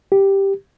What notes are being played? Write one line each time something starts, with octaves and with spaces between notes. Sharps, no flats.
G4